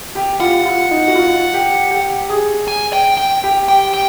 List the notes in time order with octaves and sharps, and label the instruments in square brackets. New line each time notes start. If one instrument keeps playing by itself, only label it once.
[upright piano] G4
[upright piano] F4 [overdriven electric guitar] F#5
[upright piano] F4
D#4
F#4
F4
G4
G4
G#4
[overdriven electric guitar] G#5
G5
G5
[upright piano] G4
[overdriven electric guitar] G5
G5